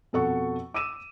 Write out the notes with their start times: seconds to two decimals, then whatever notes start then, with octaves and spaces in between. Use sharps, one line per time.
0.13 F2 B2 A4 F#5 C#6
0.74 D6 E6 D#7 E7